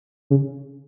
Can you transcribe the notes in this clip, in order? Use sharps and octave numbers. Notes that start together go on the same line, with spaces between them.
C#3